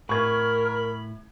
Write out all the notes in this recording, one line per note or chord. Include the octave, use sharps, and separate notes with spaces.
A2 A#4 B5 C#6 G#6